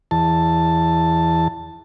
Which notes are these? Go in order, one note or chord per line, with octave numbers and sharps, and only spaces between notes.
E2 A5